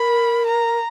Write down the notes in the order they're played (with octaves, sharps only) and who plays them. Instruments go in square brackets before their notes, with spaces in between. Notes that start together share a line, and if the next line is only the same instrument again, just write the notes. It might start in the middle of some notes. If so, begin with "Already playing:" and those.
Already playing: [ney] A#4 [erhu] B5
[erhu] A#5